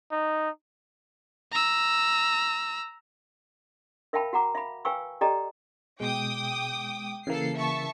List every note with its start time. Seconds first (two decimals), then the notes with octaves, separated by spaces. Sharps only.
0.11 D#4
1.52 A#5 E6
4.13 A#4 E5 F5 G5 A5 B5
4.33 F#4 F#5 A#5 D6
4.55 E5 F5 B5
4.85 B4 F5 G5 G#5 C#6 E6
5.21 G4 A4 D5 D#5 G5 A#5
6.00 B2 G#3 G5 D6 D#6
7.27 C#3 E3 A#3 A4 C7
7.58 E5 A5 C#6